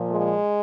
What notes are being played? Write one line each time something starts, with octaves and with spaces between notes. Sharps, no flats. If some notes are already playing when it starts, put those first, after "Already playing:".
Already playing: A#2 F3
G#3